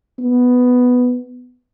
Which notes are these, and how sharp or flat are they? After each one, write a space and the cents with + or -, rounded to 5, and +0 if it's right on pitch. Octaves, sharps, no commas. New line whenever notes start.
B3 +5